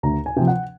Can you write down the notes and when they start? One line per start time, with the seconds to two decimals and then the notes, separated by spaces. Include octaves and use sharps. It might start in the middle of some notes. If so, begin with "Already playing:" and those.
0.03 D2 A#5
0.26 G#5
0.36 C3 F3 G5
0.47 F#5